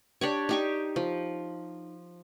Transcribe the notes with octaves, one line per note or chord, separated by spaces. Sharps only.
D4 G4 C#5
D#4 G4 C#6
F3